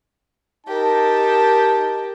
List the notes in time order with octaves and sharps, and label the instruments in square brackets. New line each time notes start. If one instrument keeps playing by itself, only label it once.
[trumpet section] D#4 A5 [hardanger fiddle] G4 A#4